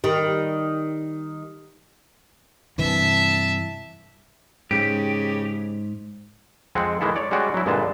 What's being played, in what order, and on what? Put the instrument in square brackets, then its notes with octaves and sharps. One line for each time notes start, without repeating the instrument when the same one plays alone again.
[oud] D#3 G3
[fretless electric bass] G2 C3 E3 [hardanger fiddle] E5 A5
[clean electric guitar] G#2 [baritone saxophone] C#3 [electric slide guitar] G4
[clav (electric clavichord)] F2 G#3 C4 F#5
D#3 E3 G#3 E4 A4
C#5 D5
G3 G#3 C#4 F#4 D5
F#3 E4
G2 A#2 D3 G#3 B4 A5